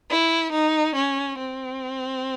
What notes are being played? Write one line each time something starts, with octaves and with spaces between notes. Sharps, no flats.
E4
D#4
C#4
C4